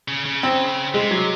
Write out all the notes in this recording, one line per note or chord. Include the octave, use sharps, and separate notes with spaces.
C#3
C#3
C4
C3 G#3
F#3